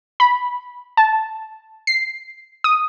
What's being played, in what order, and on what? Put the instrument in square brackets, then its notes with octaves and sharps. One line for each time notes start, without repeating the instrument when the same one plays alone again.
[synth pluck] B5
A5
C7
D#6